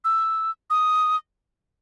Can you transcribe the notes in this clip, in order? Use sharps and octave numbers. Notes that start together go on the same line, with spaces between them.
E6
D#6